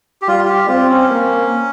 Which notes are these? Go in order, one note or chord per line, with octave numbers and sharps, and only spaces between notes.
G4
G3 F4
F4
G4
C4 F4
C#4
A#3